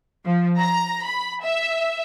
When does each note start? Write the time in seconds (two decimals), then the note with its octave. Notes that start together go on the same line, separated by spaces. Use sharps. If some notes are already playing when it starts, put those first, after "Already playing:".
0.25 F3
0.59 A#5
1.06 B5
1.44 E5